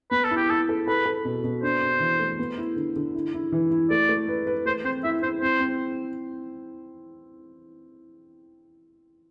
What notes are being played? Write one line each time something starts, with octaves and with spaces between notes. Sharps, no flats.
B3 B4
A4
E4
G4
E4 A4
A4
A4 B4
A4
B2
B2
D4 C5
D4
E3
A3
B3
E4
D3
D3
E4
E4
E3
E4
A3 D5
A3
B4
B4
A3 C5
C4 C5
E4 E5
E4 C5
C4 C5
C4